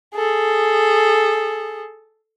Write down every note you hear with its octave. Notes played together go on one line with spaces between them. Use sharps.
G#4 A4